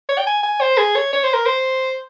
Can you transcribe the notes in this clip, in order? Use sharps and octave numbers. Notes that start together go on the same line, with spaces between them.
C#5
G5
G#5
G#5
C5
G#4
C#5
C#5
C5
A#4
C5